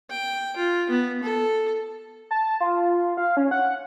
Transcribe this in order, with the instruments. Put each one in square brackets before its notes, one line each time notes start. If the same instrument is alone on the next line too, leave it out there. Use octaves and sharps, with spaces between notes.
[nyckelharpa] G5
F4
B3
A4
[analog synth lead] A5
F4
F5
C#4
F#5